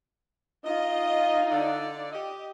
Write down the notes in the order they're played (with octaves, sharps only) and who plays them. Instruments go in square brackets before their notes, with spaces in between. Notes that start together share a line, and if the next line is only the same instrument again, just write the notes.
[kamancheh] D#4 F4 [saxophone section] D#5
[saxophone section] D3 D5
G4 D#5